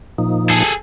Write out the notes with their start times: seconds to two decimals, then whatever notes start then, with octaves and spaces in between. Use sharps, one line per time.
0.18 A#2 F3 D#4
0.50 G#4 A4